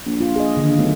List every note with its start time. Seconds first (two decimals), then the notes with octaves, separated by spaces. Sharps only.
0.06 A#1
0.21 F4
0.36 G#4 D#5
0.57 D3 D#3
0.79 B1 A3